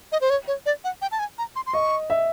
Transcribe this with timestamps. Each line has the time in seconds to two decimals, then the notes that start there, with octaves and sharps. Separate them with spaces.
0.12 D#5
0.21 C5
0.30 C#5
0.48 C#5
0.66 D5
0.84 F#5
1.02 G5
1.12 A5
1.19 G#5
1.38 A#5
1.56 C6
1.67 C6
1.73 D#5 C#6
2.10 E5